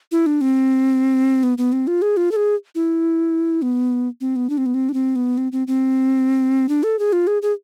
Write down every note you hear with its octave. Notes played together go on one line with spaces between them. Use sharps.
E4
D4
C4
B3
B3
C4
F4
G#4
F4
A4
G#4
E4
B3
C4
B3
D4
C4
B3
C4
D4
C4
B3
C4
C4
C4
D4
A4
G#4
F4
G#4
G#4